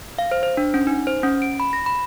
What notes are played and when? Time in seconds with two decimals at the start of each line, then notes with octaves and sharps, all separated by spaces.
0.18 F5
0.31 C5
0.43 C5
0.57 D4
0.74 C#4
0.87 D#4
1.07 C5
1.23 C#4
1.42 D7
1.60 B5
1.73 A#6
1.86 B5